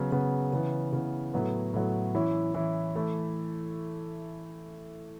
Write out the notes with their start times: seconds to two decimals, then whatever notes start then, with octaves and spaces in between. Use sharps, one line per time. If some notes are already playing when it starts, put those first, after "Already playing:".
Already playing: C#3 F#3 B3
0.11 C#3 F#3 B3
0.53 C#3 E3 B3
0.93 C#3 E3 B3
1.34 A2 F#3 B3
1.74 A2 F#3 B3
2.15 E3 C#4 E4
2.54 E3 C#4 E4
2.95 E3 A3 E4